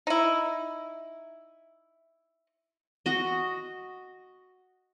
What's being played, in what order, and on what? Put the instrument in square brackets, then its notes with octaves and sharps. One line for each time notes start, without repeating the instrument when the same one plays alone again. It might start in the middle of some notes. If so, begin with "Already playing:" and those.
[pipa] D#4 E4
[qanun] F#4 D#5